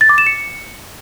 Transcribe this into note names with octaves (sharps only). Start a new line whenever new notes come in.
A6
D6
E7
C#7